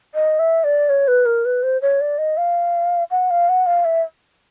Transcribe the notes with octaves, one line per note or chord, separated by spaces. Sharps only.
D#5
E5
D5
C#5
B4
A#4
B4
C5
C#5
D5
D#5
F5
F#5
F5
F#5
F5
E5